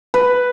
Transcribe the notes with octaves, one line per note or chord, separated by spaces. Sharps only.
B4